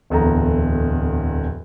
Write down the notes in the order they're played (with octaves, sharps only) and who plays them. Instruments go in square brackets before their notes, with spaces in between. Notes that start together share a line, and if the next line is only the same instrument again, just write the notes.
[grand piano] D1 E2 A4 A#5